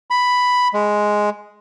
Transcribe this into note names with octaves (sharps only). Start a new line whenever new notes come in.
B5
G#3